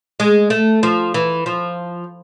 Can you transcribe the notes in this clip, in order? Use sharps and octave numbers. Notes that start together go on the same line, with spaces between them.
G#3
A3
F3
E3
F3